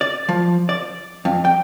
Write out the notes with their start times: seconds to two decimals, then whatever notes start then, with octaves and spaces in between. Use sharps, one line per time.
0.01 D5
0.29 F3
0.69 D5
1.25 F2
1.45 G5